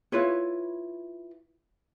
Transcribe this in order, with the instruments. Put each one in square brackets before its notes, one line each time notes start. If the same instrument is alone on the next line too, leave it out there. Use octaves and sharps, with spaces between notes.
[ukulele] E4 F4 B4 C#5